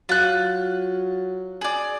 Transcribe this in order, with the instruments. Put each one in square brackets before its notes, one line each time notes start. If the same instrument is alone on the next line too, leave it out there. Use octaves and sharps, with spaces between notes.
[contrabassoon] F#3 [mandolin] F4 F#6
[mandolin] G#4 D5